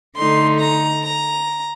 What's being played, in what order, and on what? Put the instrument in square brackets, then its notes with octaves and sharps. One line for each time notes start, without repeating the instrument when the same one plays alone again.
[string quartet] D3 A3 D#4 C6
A#5
A#5